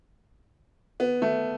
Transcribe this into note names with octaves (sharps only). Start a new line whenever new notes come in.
B3
A3